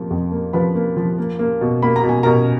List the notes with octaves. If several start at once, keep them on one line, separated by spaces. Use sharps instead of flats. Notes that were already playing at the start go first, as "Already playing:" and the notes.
Already playing: F2 F3 A#3
F2
A#3
F3 B4 B5
A#3
F3
A#3
A#3
B2
A#3 B5
A#5
B2
G#5
B2 A#4 A#5